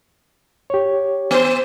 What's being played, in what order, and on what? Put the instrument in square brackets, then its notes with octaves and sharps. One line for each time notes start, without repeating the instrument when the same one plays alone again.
[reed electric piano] G4 C#5
[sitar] B3 C5